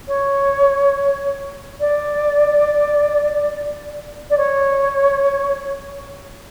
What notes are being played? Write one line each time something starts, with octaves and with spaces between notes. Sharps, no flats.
C#5
D5
D5
C#5